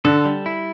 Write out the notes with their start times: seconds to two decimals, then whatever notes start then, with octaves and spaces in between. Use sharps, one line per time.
0.05 D3 A4
0.25 G3
0.46 E4